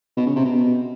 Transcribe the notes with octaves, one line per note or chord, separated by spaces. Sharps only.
B2
C#3
C3
B2